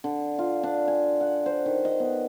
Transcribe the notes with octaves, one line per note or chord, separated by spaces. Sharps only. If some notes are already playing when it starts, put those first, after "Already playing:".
D3
F4
D4
G#5
F#5
C5
D#3
D#5
B3